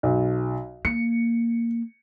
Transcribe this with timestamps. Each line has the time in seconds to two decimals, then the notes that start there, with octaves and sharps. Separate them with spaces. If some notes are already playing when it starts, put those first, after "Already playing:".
0.03 B1
0.85 A#3 C#7